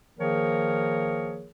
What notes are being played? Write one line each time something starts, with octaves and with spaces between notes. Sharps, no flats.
D#3 F3 A#3 G#4 A#4 C#5